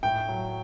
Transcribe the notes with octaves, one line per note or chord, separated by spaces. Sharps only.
A2 G5
F#3